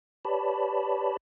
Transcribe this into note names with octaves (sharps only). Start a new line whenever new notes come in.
G4 B4 C#5 D5 A5 B5